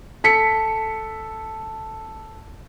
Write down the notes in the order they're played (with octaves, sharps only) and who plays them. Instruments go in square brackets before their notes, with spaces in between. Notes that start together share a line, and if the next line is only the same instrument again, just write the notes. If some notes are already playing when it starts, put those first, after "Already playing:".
[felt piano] A4 B6 C#7